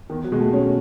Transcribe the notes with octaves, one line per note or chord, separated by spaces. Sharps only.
E2 D#3
F#3
B2 G#3
A3
C#4